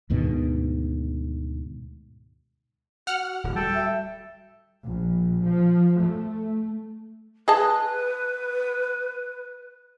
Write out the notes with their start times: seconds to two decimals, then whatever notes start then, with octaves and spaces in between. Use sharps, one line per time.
0.10 D2 G#2 B2 D#3
3.07 F#4 F#5 F6
3.44 D1
3.56 G3 F#4 A4 G5 A5
3.74 E5
4.83 A#1
5.46 F3
6.01 A3
7.48 G#4 B4 D#5 A5